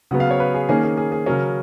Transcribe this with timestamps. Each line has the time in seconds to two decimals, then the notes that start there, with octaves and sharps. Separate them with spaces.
0.11 C#3 F#3 B3 F#5
0.20 F5
0.31 C#5
0.40 B4
0.54 G#4
0.69 D#3 A#3 C#4 G#4
0.83 G#4
0.97 G#4
1.12 G#4
1.26 C#3 F#3 C#4 A#4